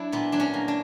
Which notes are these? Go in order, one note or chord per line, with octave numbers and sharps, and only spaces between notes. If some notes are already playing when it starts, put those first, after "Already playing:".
Already playing: F#3 D4 E4
A#2 B3
F#3 D4
C#4
A#3
D4